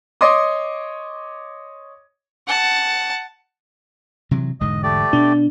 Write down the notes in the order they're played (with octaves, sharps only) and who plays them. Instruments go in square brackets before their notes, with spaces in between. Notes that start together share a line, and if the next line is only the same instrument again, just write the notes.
[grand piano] C#5 D#5 C6 D6 D#6
[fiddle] F#5 A5
[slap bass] C3 E3 F#3
[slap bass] E1 G#2 D3 [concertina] D#5
[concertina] A3 G4 D5
[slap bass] B2 [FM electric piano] D4